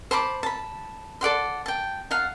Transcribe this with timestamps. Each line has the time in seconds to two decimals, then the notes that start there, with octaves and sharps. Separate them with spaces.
0.11 C5 A5 B5 D6
0.43 A5 B5
1.21 A4 D5 F#5 C6
1.66 G5 A5
2.11 F5 F#5 A5